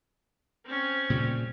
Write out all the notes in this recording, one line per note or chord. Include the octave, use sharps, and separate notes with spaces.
C4 C#4
A#2 C#3 G3